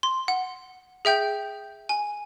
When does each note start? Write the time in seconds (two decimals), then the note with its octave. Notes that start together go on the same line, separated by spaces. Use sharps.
0.03 C6
0.28 F#5
1.05 G#4 E5 G5 G6
1.89 G#5